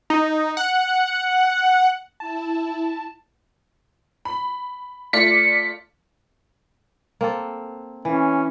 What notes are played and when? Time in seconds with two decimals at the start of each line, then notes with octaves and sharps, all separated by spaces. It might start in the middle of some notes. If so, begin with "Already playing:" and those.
0.10 D#4
0.57 F#5
2.20 E4 A5
4.25 B5
5.13 A3 F4 D5 B6 C#7
7.21 A#3 C4 A4
8.05 E3 C#4